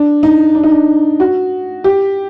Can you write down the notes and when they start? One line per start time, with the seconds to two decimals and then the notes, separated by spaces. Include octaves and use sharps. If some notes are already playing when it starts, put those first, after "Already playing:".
Already playing: D4
0.23 D#4
0.55 D4
0.64 D#4
0.71 D4
1.20 F#4
1.84 G4